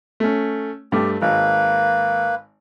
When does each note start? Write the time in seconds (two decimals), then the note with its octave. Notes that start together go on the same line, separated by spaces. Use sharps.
0.20 A3 C#4
0.92 G2 A3 G4
1.22 G#1 A#3 B4